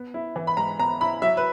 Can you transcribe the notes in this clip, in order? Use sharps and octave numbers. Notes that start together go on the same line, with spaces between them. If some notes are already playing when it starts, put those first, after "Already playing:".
Already playing: B3
E4
E3
B5
G#2 A#5
B3 A#5
E4 B5
F#3 E5
B4